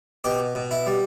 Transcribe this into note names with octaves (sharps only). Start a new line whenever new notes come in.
B2 G4
B2
E4
G3